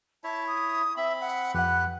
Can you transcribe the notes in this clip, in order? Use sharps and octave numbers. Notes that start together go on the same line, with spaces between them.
E4 C#5 E5 A5
D#6
C4 E5 B5
F#5
F2 G4 B4 F#5 F#6